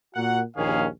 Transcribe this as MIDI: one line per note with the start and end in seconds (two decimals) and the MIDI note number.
0.15 0.41 46
0.15 0.41 66
0.15 0.41 70
0.15 0.41 78
0.57 0.86 34
0.57 0.86 39
0.57 0.86 51
0.57 0.86 61
0.57 0.86 68
0.57 0.86 77